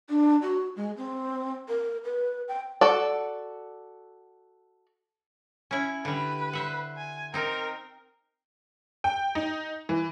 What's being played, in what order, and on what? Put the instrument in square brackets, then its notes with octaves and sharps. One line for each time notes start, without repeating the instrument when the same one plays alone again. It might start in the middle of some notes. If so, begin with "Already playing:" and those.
[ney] D4
F#4
G#3
C4
A#4
B4
G5
[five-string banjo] F#4 A4 D5
[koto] C#4 E4
[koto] D3 G3 [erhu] B4
[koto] C5 E5 F#5
[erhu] G#5
[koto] C4 D#4 [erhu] A#4
[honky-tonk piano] G5
D#4
E3